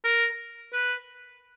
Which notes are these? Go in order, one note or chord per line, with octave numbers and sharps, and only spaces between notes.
A#4
B4